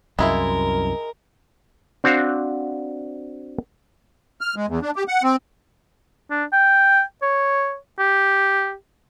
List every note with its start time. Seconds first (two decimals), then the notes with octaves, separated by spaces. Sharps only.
0.19 C2 F#2 G#3 E4 F4 A#4
2.04 C4 D4 F#4 C5 F5
4.41 F6
4.56 G#3
4.68 E2
4.82 D4
4.96 G4
5.08 F#5
5.23 C4
6.30 D4
6.53 G5
7.22 C#5
7.99 G4